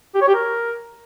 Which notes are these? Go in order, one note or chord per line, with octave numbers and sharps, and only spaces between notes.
G4
C#5
G4
A#4